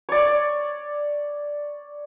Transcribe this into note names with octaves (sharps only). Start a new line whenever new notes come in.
C#5 D5